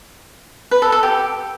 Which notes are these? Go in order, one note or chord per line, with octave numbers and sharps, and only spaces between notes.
B4
A4
A4
G4